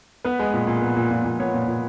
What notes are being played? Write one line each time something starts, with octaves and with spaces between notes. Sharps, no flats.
B3 B4
G#3
A#2
A#2
B3
A#2
A#2
A#2
B3 C#5
A#2
A#2